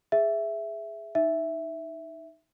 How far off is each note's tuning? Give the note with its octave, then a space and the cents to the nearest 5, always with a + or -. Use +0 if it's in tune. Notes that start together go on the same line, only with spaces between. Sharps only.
G#4 +0 E5 +5
D#4 +0 E5 +0